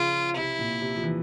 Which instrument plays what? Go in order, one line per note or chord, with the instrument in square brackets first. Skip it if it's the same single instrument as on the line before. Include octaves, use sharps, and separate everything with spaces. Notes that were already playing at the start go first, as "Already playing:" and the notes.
Already playing: [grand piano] C#3 F3 [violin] F4
[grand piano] C3 [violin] E4
[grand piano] A#2
C3
F3
E3